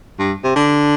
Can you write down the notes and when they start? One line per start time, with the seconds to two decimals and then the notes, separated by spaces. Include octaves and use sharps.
0.19 G2
0.43 C3
0.56 D3